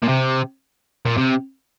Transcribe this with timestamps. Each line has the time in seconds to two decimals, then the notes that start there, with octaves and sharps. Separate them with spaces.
0.03 A#2
0.08 C3
1.05 A#2
1.17 C3